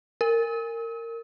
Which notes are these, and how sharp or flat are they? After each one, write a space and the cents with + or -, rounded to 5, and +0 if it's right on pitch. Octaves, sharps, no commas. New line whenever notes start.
A#4 -20